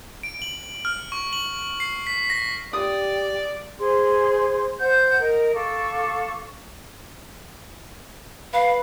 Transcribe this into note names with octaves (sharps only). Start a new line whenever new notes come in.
D7
F#7
F6
C#6
F#7
C7
B6
A#6
G4 D5 D#6
G#4 C5 C6
C5 F#5 G6
A#4 D#5
A4 F5 C#6 D6
B4 F5